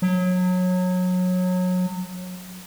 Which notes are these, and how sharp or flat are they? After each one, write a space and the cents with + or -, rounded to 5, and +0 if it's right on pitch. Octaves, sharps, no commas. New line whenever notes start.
F#3 -25